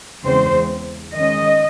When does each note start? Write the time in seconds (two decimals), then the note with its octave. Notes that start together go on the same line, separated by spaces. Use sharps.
0.24 E2 C#3 G#3 C4 C5
1.13 D#3 G#3 C#4 D#5